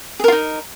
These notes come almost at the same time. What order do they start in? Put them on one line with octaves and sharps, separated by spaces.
G#4 A#4 F4 D#4